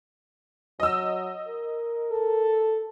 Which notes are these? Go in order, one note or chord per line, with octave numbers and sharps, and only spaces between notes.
F#3 D#5 E6
A#4
A4